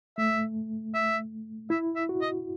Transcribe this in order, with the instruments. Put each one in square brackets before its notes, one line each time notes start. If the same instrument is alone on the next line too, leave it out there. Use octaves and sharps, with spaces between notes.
[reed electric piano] A3 [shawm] E5
[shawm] E5
[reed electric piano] E4 [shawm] E5
[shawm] E5
[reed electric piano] F#4
[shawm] D#5